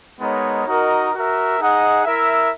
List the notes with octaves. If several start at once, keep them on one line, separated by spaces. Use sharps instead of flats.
G#3 B3 D#4 A#4 C#5
D#4 F#4 A#4 D#5
F#4 A#4 E5
D#4 G#4 D#5 F#5
E4 A#4 E5